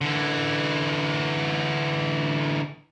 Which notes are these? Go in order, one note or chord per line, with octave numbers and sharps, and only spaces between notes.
D3 E3